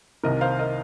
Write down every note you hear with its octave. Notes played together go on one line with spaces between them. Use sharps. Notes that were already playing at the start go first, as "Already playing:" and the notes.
C2 C3 D#3 A#4 D#5
C5 F5
A#4 D#5